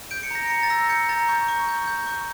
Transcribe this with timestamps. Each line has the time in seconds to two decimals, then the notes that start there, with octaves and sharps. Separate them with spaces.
0.11 G6 D7
0.23 C#7
0.31 A#5 A#6
0.47 A#5 C#7
0.63 A6
0.70 E6 A#6
0.89 G6 C#7
1.09 A#5 A6
1.29 C#6 G6
1.48 C#6
1.68 G6
1.88 G6
2.07 C#6